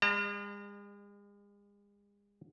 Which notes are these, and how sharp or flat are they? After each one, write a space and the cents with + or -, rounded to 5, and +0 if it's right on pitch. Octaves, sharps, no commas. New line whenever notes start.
G#3 -40 D5 +40 A#5 -45